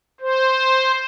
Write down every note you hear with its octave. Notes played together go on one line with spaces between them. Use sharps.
C5